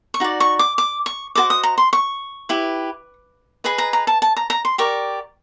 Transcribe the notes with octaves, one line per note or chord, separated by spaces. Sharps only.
C#6
D#4 F#4 D5
C#6
D6
D6
C#6
F#4 A4 C5 D#5 D6
D#6
A#5
C6
C#6
E4 G4 B4
G#4 B4 D#5 B5
A#5
A#5
A5
A5
A#5
A#5
C6
G4 A#4 D5 C#6